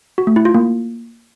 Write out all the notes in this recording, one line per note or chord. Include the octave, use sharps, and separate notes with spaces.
F#4
A3
E4
F4
A#3